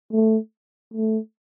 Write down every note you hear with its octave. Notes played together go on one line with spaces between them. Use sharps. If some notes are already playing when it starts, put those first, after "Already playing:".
A3
A3